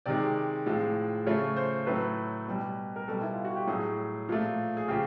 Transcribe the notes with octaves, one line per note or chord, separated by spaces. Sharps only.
C3 D#3 G#3 D5
A2 F3 G#3
C#3 F3 A3 C#5
C5
A2 F#3 A3 B4
B2 G3
A#4
B2 G3 A4
E4
F4
F#4
G4
A2 F#3 A3 G#4
A#2 F3 A3
G#4
C#3 F3 G4